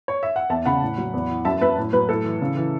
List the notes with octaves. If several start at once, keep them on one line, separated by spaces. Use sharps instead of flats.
C#5
E5
F#5
E2 E5 A5
C#3 F#5 B5
A2
F#3
E2
E3
F#2 E5 A5
F#3 B4 E5
A2
F#3 B4
A2 A4
E3
C#3
E3